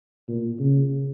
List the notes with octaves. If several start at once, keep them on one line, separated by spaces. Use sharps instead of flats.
A#2
C#3